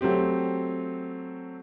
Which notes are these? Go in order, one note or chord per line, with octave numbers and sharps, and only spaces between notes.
F#3 A3 C4 G4